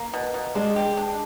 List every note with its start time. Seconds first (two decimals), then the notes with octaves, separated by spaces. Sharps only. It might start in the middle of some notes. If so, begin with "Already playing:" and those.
Already playing: A#3
0.14 B2
0.34 B2
0.55 G#3 D4
0.76 G4
0.97 D4